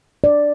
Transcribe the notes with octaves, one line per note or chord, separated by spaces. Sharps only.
D5